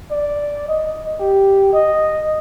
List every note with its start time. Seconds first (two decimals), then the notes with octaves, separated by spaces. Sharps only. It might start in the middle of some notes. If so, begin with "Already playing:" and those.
0.11 D5
0.68 D#5
1.20 G4
1.73 D#5